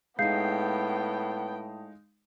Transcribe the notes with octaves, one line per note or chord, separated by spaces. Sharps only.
A2 G#3 B3 D#4 F5 G5 G6 C7